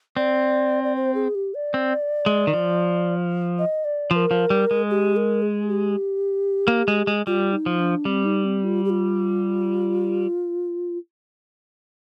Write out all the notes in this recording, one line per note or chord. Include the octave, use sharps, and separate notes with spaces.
C4 D5
D5
C5
G#4
G4
D5
C4
G#3
D#3
F3
D#5
D5
F3 C5
A#4
F3
G3
G#3
G4
A#4
G#4
G4
A#3
G#3
G#3
G3 F4
D#4
F3
D4
G3 C4
D#4
C4
F4
G4
F4